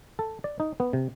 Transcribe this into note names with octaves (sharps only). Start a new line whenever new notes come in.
A4
D5
D#4
B3
C3